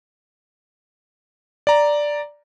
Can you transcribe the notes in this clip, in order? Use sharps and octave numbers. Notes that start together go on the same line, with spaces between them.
D5 A#5